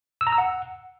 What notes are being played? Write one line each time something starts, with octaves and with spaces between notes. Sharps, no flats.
E6
A#5
E6
F#5